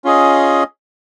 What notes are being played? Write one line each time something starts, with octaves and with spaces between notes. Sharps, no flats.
C#4 F4 G#4 D#5